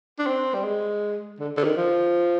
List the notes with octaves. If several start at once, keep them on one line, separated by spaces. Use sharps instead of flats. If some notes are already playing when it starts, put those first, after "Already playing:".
D4
C4
G3
G#3
D3
D3
D#3
F3